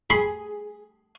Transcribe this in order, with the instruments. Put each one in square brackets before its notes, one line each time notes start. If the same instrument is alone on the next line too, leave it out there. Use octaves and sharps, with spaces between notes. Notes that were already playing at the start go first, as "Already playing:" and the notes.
[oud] G#4 [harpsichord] B5 C6